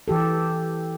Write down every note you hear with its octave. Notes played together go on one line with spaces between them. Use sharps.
E3 G4 A4